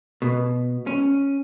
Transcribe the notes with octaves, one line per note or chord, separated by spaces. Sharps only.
B2
C#4